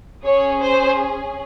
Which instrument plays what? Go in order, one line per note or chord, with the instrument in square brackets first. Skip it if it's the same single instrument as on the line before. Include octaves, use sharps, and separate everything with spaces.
[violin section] C#4 G#4 C#5
C5